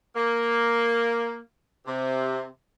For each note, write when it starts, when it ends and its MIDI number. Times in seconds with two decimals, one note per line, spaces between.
0.15 1.39 58
1.87 2.46 48